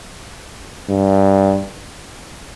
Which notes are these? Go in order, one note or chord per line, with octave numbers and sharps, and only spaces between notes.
G2